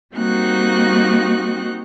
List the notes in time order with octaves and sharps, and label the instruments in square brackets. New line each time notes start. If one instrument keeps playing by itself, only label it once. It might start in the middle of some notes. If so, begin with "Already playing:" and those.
[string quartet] G3 A#3 C4 D#4 F#4 F#6